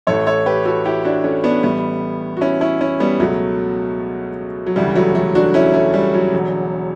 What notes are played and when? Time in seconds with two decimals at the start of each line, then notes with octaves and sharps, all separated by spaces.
0.07 A1 A2 E3 A4 C#5
0.27 A4 C#5
0.46 G4 B4
0.65 F#4 A4
0.85 E4 G4
1.05 D4 F#4
1.24 A3 C#4
1.44 B3 D4
1.63 A1 A2 E3 G3 B3
2.37 F#4
2.41 C#4 E4
2.61 C#4 E4
2.81 C#4 E4
3.00 G3 B3
3.20 C#2 B2 F#3 A3
4.67 F#3
4.76 E1 D2 C#3 E3 G3
4.95 F#3 A3
5.15 F#3 A3
5.35 D4 F#4
5.54 C#4 E4
5.74 A3 C#4
5.94 G3
6.14 F#3
6.33 E1 E2 D3